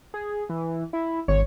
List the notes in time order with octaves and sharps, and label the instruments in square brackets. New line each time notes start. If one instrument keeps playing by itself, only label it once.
[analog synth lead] G#4
E3
E4
[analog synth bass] G#1 [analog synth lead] C#5